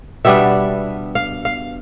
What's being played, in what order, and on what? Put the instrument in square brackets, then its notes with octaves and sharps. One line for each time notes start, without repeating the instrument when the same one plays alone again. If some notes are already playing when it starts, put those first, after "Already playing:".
[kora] B2 G3 B3 D4 E5
F5
F5